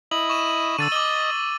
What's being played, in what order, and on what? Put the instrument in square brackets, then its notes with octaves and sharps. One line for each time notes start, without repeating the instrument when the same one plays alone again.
[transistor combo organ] E4 D#5 [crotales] F#7
[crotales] C#6 E7
[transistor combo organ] D3 [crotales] E6 A6 D#7
[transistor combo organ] D#5 [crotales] D6 G7